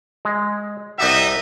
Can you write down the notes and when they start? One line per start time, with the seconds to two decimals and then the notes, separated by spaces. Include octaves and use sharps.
0.25 G#3
0.98 C2 D#4 G4 D#5 E5 F#5